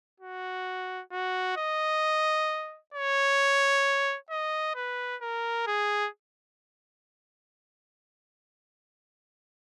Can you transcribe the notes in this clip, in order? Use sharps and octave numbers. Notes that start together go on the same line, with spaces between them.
F#4
F#4
D#5
C#5
D#5
B4
A#4
G#4